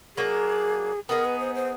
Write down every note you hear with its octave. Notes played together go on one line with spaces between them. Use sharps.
F#3 A#3 D4 G#4
B3 D#4 G#4 A#4
B4
C5
C5